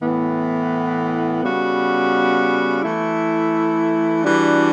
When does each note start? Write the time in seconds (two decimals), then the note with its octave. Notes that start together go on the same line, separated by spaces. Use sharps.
0.02 A2 E3 B3
1.42 C#3 G3 B3 F#4
2.82 E3 A3 E4
4.23 E3 G3 D4 F#4